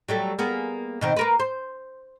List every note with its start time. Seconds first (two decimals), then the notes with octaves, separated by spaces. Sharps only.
0.08 F#3 G3 A3
0.39 A#3 B3 G#4
1.01 B2 D#3 C4
1.17 A#3 A#4 B4
1.40 C5